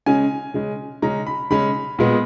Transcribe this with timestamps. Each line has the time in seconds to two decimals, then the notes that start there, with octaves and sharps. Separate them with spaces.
0.06 C#3 G#3 C#4 G#5
0.54 C#3 G#3 C#4
1.02 C#3 G#3 C#4 A#5
1.27 B5
1.50 C#3 G#3 C#4 B5
1.99 A#2 G#3 B3